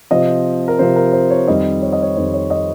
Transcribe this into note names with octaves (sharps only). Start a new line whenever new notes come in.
C3 F3 C4 D#5
A#4
C3 F3 C4 C5
A#4
C5
C#5
F2 D#3 G3 C4 D#5
C#5
D#5
C#5
F2 D#3 G3 C4 C5
C#5
D#5